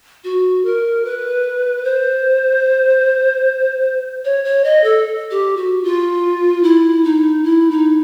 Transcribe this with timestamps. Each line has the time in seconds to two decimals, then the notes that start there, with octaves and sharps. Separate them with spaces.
0.24 F#4
0.65 A#4
1.05 B4
1.85 C5
4.25 C#5
4.45 C#5
4.64 D#5
4.84 A4
5.31 G4
5.57 F#4
5.84 F4
6.63 E4
7.05 D#4
7.43 E4
7.71 D#4